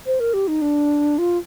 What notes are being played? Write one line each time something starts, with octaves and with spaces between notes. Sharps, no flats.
C5
A#4
G4
D#4
D4
F4